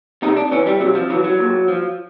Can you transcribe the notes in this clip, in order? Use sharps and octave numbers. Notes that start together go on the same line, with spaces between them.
C3 D#4
D4
E3 C#4
G3
C3 F#3
F3
E3 F#3
F#3
A#2
F3